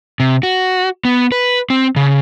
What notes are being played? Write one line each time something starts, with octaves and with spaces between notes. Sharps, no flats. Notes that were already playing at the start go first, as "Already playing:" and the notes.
C3
F#4
B3
B4
C4
C#3